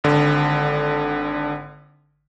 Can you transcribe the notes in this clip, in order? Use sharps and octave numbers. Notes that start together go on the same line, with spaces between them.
G#1 D3